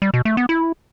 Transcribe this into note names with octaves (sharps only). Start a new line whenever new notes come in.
G3
B2
A3
B3
E4